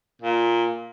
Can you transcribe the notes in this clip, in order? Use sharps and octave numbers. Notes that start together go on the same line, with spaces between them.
A#2